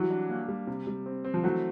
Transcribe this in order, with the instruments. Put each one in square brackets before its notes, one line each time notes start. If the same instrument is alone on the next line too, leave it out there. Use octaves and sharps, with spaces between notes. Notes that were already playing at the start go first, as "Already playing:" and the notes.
Already playing: [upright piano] E3 F#3 [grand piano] G3
[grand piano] D4
A#3
G3
C3
G3
C4
C4
[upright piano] F3
[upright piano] E3 F#3 [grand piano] A3